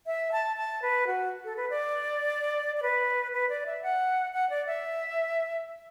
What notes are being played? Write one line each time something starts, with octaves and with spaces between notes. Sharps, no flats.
E5
A5
A5
B4
F#4
A4
B4
D5
D5
B4
B4
D5
E5
F#5
F#5
D5
E5